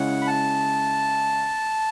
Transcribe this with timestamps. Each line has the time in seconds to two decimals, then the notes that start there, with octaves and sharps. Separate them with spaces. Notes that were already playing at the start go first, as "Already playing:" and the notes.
Already playing: C#3 G#3 C#4 E4 F#5
0.22 B5
0.27 A5